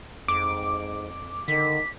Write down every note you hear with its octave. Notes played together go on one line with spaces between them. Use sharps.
F2 G#2 D6
D3 D#3 B6